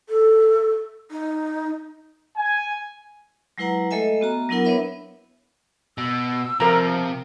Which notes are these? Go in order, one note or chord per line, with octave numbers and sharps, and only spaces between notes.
A4
D#4
G#5
F#3 G#3 E4 B4 F#5 A#5
G#3 A3 A4 D#5 E5 G#5
B3 F#4 A#5
F#3 B3 D4 E4 A#4 F#5
B3 D4 B4 C#5 E5 B5
B2 E6
C3 F3 A#4 A#5